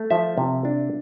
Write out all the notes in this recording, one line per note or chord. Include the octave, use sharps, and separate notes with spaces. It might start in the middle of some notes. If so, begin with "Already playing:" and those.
Already playing: A3
F3 E5
C3
D4